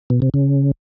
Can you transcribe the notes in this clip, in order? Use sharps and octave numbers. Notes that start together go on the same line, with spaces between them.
B2
C3
C#3